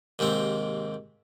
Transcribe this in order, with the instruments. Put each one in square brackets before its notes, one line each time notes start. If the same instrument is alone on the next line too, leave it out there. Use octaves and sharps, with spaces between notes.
[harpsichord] D#2 G#2 C3 C4